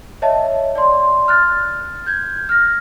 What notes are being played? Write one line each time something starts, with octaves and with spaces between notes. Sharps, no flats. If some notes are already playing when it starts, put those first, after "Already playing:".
C#5 D#5 E5 A5
D5 C6
F6 F#6 A6
G6 G#6
F6 A#6